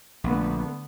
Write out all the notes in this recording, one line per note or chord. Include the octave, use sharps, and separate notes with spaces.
A#1 D3 A3 B3